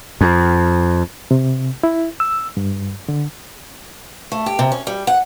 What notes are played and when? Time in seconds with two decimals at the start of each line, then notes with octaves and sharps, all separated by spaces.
0.21 F2
1.31 C3
1.83 E4
2.20 E6
2.57 G2
3.08 D3
4.32 A3
4.46 G4
4.59 C3
4.72 C#4
4.87 G3
5.07 F#5